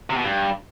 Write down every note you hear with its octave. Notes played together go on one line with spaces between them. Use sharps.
C3
B2
G2